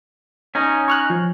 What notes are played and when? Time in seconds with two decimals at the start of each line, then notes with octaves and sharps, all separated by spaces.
0.55 C#4 D#4
0.88 C#6 F6 F#6
1.10 F3